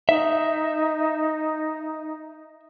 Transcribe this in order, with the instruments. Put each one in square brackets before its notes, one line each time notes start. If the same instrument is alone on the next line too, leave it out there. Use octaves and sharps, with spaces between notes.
[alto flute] D#4 [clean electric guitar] E5